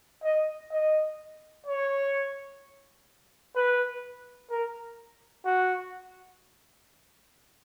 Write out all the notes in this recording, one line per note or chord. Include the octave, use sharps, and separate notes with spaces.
D#5
D#5
C#5
B4
A#4
F#4